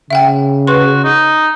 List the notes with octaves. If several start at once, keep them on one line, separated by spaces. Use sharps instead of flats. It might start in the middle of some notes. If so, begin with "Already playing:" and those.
C#3 E5 F#5 G5
F#4 B4 C6
D#4